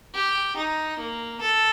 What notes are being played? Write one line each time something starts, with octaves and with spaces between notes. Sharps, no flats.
G4
D#4
A#3
A4